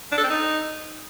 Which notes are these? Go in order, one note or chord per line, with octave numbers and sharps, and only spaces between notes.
D4
A4
C4
D#4